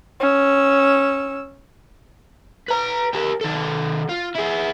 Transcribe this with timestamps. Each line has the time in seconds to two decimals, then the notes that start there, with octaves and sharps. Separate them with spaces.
0.20 C#4 E6
2.68 B4 A#5
3.13 G4 A#4
3.41 D#3 A4
4.09 F4
4.35 E4 G#4